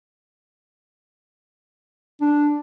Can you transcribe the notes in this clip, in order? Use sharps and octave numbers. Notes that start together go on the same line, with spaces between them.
D4